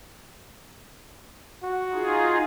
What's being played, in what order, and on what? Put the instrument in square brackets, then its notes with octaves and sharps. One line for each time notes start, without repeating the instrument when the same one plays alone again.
[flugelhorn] F#4
[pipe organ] D#4 F4 G#4